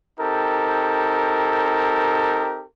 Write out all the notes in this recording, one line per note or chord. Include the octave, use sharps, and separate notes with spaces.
C4 D#4 G4 A4 A#4